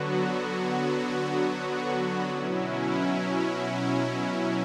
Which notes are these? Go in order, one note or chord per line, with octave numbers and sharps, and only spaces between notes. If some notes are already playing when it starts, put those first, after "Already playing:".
Already playing: D3 F#3 B3 F#4
B2 F#3 C#4 E4